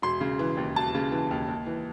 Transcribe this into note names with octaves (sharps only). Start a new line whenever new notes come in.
E1 C6
C#3
E3
D#2
E1 A5
C#3
E3
D#2
D#2
E3